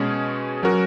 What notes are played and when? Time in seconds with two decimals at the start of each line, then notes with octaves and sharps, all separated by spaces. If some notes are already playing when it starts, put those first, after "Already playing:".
Already playing: B2 G#3 C#4 G#4
0.63 F#3 C#4 F#4 A#4